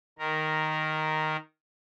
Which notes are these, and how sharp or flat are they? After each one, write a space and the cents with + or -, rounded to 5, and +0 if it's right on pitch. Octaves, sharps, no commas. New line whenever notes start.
D#3 +0 A#4 +0